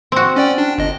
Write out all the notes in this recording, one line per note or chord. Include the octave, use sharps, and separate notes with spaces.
C4 F#4
C#4 D5 G5
D4 G5
G1 D#5